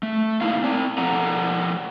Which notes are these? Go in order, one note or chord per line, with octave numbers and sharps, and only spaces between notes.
A3
A#3 D#4 E4 F5
C4 D5
F3 A4 D5 F#5 A#5